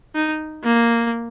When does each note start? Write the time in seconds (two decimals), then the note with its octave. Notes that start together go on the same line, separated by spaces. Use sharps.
0.15 D#4
0.64 A#3